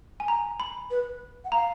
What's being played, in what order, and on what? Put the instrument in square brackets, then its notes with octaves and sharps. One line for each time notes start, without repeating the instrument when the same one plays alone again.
[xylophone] G#5
A#5
B5
[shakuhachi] B4
F#5
[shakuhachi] F5 [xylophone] A#5